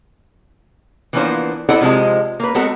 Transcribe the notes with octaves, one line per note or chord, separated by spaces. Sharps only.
E3 F3 A#3 B3 D4 C5
E4 A4 C5 D5 D#5 F#5
C3 F3 G#3 A5
A#3 B4
G#3 B3 C4 F#4 A4 A#4